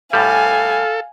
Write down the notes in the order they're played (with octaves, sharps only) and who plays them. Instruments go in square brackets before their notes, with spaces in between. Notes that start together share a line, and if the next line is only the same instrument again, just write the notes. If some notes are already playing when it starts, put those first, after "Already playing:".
[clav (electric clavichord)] A2 G3 [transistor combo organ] A4 [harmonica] F5 [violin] G#5